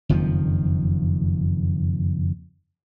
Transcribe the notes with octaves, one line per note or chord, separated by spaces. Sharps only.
F#1 F2 D#3 F3